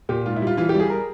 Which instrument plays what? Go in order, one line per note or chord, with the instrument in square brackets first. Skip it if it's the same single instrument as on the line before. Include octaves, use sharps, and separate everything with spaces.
[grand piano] A#2 G4
G#2 F4
E4
G3 F4
E3 F4
G4
G3
G#4
A#4